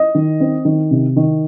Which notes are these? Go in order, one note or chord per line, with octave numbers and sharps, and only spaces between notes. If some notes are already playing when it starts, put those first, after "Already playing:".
Already playing: D#5
D#3
C4
D#3
C3
D#3